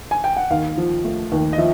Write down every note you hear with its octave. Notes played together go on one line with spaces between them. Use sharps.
G#5
G5
F#5
D#2 F5
F3
A3
D#2
D#5
F3 E5